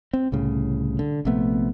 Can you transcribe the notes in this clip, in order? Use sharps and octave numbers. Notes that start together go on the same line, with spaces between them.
C4
C2 A2 C#3
D3
A#1 C3 A3 B3